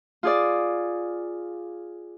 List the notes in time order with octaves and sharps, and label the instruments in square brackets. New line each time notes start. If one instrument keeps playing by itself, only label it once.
[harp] F4 G#4 D5